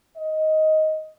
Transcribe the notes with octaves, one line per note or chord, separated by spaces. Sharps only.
D#5